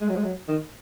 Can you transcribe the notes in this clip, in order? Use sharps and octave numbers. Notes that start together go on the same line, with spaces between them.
G#3
F#3
G#3
F#3
D#3